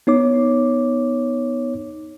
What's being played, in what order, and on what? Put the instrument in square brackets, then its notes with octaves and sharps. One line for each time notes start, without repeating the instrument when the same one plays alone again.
[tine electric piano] B3 D#4 C#5 D6